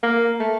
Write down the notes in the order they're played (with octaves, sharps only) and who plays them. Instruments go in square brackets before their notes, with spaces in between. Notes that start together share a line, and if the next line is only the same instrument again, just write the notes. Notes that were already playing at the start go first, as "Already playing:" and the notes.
[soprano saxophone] A#3
A3